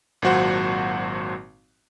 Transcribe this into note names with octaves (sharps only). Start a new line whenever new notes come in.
G#1 A#2 F#3 F#4 C5 F#5